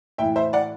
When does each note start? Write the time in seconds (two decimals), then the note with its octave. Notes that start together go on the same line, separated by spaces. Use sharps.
0.18 A2 E3 E5 G5
0.36 C5 E5
0.53 D5 F#5